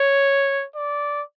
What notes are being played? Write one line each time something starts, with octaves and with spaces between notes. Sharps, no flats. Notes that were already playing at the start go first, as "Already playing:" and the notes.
Already playing: C#5
D5